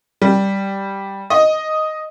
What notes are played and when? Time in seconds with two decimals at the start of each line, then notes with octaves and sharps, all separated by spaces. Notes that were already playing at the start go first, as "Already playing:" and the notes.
0.22 G3
1.30 D#5